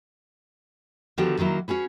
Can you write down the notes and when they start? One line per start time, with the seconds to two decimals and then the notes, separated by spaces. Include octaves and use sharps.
1.18 D3 D#3 F3 B3 F#4 G4
1.38 D#3 F#3 A#3 E4
1.68 C#4 F#4 G#4 B4